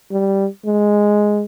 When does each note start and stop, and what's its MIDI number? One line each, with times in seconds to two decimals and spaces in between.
0.11 0.47 55
0.66 1.44 56